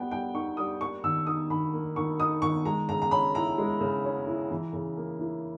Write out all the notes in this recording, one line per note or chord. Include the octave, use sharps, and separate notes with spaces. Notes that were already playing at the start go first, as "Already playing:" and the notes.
Already playing: G3 B3 G5
G3 G5
D#4 C#6
G3 D#6
A#3 C#6
D#3 E6
D#4 D#6
D#3 B5
A#3
D#3 C#6
D#4 D#6
D#3 C#6
G#3 A#5
C#3 A#5
A#5
C#4 B5
E4 A#5
G#3
C#3
C#4
E4
E3
C#3
A#3
E4